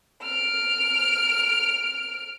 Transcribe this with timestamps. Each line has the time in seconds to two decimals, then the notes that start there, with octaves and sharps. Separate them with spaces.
0.23 F6 D7